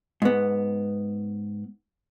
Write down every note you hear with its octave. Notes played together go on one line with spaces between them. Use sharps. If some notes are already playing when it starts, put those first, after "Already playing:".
G#2 B3